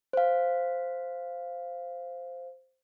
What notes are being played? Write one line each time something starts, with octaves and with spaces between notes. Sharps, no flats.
C5 F5